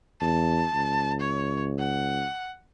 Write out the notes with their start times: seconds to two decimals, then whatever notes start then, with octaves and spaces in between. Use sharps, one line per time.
0.21 E2 A5
0.74 C#2
1.20 C#5
1.79 F#5